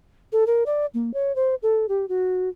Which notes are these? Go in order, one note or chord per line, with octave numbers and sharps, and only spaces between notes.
A4
A#4
D5
A#3
C#5
C5
A4
G4
F#4